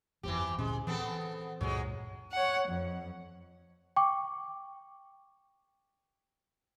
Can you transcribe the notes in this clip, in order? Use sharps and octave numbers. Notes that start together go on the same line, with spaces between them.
G1 F2 E3 C4 G4
D2 A#2 G#3 C#4
E3 B3 C4 A4
C#2 G2 A#2 F#3 G#3
C#5 F#5
F2
G5 C#6 D6